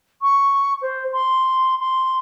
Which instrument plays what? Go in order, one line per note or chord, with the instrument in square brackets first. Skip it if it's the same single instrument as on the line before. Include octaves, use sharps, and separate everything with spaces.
[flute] C#6
C5
C6
C6